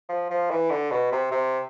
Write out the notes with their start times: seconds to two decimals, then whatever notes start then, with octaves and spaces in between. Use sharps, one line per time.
0.09 F3
0.30 F3
0.50 E3
0.70 D3
0.91 B2
1.12 C3
1.31 C3